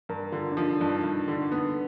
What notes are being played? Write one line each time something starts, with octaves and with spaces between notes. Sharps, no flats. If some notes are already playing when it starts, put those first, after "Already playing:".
G2 A#4
D3 F4
D4
F3 D#4
G2 D#4
G2
D3
B3 D4